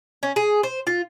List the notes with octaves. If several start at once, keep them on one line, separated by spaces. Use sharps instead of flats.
C#4
G#4
C5
F4